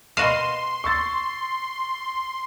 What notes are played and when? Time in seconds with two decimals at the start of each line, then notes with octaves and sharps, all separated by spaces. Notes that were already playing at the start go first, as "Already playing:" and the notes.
0.17 B2 F#4 F5 C6 C7 D#7 E7
0.84 C#6 E6 A6